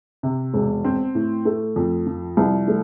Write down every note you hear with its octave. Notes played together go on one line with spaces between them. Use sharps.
C3
E1
C4
A2
A3
F2
F3
C2
A3